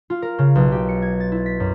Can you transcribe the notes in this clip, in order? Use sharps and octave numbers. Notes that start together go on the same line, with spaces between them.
F4
A#4
C#3
B1
G4
C#7
G#6
A6
E4
B6
F#2